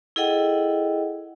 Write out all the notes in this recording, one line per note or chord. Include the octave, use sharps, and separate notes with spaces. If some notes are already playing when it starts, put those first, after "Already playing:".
E4 G#4 A4 D#5 F#5 G5